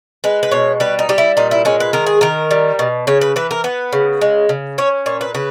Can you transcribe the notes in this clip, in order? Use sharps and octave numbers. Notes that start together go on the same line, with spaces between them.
G#3 B4
B4
B2 C#5
G3 B4
D#4
G3 G4
E4
A#2 D#4
E4
G#3 C#4
B4
D#3 A#4
G#4
D#3 A#4
G3
B2
C#3 C#5
B4
E3 B4
A#4
B3 B4
C#3
G#3
C#3
C#4 C#5
A#2 C#5
B4
C#3 B4